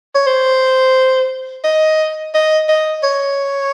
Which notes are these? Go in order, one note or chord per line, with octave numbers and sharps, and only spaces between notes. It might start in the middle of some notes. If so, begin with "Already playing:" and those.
C#5
C5
D#5
D#5
D#5
C#5